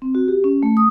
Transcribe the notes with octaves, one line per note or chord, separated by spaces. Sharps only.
C4
F#4
G4
C#4
A3
D#6